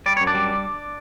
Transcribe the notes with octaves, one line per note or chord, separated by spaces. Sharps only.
G3 D5
F#2 C#5
D4 D5
G3